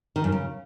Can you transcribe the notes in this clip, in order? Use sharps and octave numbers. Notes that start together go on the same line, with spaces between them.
D#3
F#2
C#3